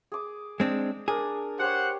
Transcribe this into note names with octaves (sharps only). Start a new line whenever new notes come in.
G#4 D6
G#3 C4 D4
D4 G#4 A#4
G4 C5 C#5 F#5